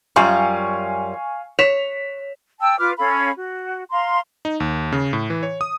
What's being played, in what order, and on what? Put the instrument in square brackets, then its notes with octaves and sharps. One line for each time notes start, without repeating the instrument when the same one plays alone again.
[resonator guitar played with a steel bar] F#2 G3 F4 [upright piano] F5 G#5 C#6
[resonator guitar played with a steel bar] C#5 [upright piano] B6 E7 F7
[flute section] G5 A5 E6
F4 B4 D6 F6
C#4 A4 F5 B5
F#4
F5 A#5 C6
[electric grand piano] D#4
D#2
C#3
A2
E3
C#5
D#6